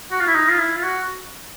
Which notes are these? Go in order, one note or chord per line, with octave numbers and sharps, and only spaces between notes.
F#4
F4
E4
D#4
F4
E4
F4
F#4